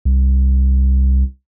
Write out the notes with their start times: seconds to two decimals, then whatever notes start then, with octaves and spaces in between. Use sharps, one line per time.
0.05 C2